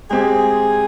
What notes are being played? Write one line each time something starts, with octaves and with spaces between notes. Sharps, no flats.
G#3 C4 G4 G#4